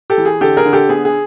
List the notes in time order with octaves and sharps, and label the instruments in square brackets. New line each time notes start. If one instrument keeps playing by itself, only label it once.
[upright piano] G4 A4
E3
G#4
D3 G4 A4
G#4 A#4
D3
G4 A4
B3 G#4
G#4